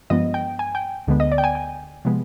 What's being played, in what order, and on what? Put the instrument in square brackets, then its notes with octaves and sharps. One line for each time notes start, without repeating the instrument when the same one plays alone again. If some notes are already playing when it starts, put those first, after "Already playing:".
[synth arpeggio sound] G2 F3 G#3 B3 D#5
G5
G#5
G5
D2 D3 G#3 B3
D#5
D5
G5
G#5
G5
C3 F3 G#3 B3